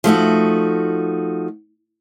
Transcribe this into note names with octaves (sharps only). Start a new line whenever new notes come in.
F3 A3 D#4 F#4